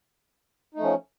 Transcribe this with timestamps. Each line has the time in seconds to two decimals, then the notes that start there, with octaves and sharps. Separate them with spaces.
0.74 D#4
0.77 A3
0.80 F3
0.83 C#4